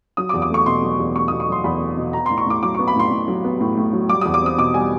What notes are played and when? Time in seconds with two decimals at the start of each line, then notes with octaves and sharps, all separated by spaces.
0.17 F#3 D#6
0.29 D6
0.34 E2
0.42 D6
0.50 A3 C#6
0.66 B2 C6
0.82 F#3
1.00 E2
1.15 A3 C#6
1.28 B2 D#6
1.40 C#6
1.48 F#3 C6
1.64 E2 B5
1.81 A3
1.97 B2
2.13 B3 A#5
2.26 A2 C6
2.38 C#6
2.46 A2 D6
2.63 F#3 D6
2.75 B3 C#6
2.88 B5
2.95 A2 C6
3.11 A2
3.28 F#3
3.44 B3
3.60 A2
3.77 A2
3.93 F#3
4.09 G3 D6
4.21 E2 D#6
4.34 D6
4.42 C4 D#6
4.58 B2 D6
4.74 G3 G#5